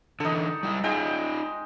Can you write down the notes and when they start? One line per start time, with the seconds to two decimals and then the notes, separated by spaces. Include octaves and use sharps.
0.20 D3 E3 D#4 A4
0.63 G3 E4
0.84 G#3 D#4 F4 G5